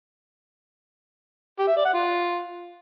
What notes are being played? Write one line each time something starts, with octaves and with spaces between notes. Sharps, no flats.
G4
E5
D5
F#5
F4